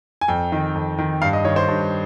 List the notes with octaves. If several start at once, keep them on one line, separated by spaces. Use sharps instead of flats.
G#5
F2 G5
D#3
F2
D#3
G2 F5
D#5
D#3 C#5
C5
G2